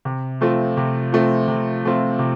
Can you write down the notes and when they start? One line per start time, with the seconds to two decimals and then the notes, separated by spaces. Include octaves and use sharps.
0.05 C3
0.41 F3 A3 C4 F4
0.77 C3
1.12 F3 A3 C4 F4
1.48 C3
1.84 F3 A3 C4 F4
2.19 C3